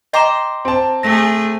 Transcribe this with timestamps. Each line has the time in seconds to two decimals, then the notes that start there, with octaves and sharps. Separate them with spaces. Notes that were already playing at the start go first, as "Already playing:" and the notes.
0.13 D#5 G5 A#5 C6 D6 E7
0.65 C4 A5
1.03 A3 G#4 A#6